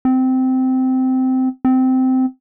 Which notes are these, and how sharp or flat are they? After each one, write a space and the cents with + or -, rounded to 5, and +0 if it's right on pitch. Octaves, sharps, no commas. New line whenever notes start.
C4 -15
C4 -15